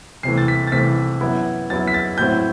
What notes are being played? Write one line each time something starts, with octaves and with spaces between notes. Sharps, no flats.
C2 C3 E3 A3 C7
A6
B6
A6
C2 C3 E3 A3 B6
F#2 F#3 B3 E4
F#2 F#3 B3 E4 A6
B6
A6
A2 F#3 C4 E4 G6